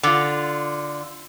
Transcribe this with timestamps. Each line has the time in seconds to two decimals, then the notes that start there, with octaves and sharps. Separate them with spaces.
0.03 D3 F4